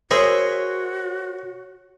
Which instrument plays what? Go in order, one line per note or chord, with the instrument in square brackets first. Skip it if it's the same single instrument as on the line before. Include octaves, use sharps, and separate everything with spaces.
[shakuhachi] F#4 [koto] G#4 E5 [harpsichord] A#4 C5 [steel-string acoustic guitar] C#5